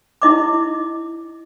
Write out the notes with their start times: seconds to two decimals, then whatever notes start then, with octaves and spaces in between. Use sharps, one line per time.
0.22 E4 D#5 D6